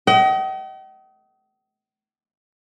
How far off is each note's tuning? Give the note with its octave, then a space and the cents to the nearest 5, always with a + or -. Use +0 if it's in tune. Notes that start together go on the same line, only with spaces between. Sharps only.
D#5 +25 G5 -45